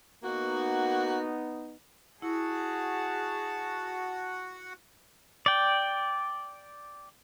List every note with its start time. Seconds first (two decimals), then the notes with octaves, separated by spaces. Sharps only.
0.23 A#3 B3 D#4 F#4
2.22 E4 F#4 G#4 F#5 A5
5.46 D5 G5